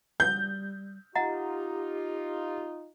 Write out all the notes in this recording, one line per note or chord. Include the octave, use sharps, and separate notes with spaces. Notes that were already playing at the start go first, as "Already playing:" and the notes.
G3 G6
D#4 F4 G4 D#5 F#5 A#5